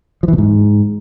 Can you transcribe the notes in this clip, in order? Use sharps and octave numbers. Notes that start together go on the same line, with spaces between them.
F3
E3
B2
G#2